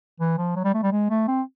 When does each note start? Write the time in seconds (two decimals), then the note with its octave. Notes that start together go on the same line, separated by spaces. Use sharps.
0.20 E3
0.38 F3
0.56 F#3
0.65 G3
0.74 A3
0.83 G3
0.92 G#3
1.10 A3
1.28 C4